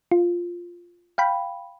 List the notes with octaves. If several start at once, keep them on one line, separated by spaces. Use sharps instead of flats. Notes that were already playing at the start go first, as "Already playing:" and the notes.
F4
F5 G5 B5